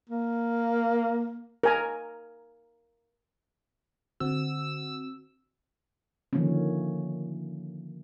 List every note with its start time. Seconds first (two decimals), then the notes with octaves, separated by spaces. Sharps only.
0.10 A#3
1.64 A#4 G#5 A#5
4.20 D3 C4 F#4 E6
6.33 D3 D#3 F3 A3 A#3 C#4